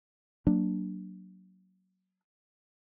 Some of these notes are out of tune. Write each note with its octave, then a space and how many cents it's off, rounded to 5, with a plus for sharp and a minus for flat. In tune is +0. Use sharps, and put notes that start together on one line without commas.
F#3 +15 A#3 +0 D4 +0